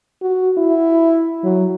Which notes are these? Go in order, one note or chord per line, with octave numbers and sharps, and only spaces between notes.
F#4
E4
F#3